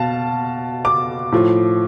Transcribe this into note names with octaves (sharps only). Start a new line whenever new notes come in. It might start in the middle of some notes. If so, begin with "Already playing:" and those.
Already playing: B2 F5 A5
D6
A2 F3